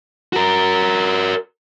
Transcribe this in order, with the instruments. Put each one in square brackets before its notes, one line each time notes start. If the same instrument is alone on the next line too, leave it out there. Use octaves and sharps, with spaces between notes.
[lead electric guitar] F#4 A#4